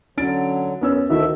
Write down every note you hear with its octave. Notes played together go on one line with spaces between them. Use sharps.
D3 F#3 C#4 A6 D7
F#2 B3 C#4 E6
D2 D#3 A3 E4 F#4 E5